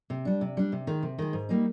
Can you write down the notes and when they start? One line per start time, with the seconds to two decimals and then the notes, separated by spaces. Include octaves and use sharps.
0.10 C3
0.25 G3 D4
0.41 C3
0.57 G3 D4
0.72 C3
0.87 D#3 G#3
1.03 C3
1.19 D#3 G#3
1.33 G#2
1.49 G3 A#3 D#4